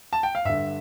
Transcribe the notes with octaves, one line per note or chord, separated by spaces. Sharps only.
A5
G5
F5
G2 D3 E5